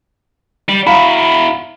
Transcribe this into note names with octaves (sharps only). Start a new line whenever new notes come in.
G3
E4 F#4 F5 A#5 B5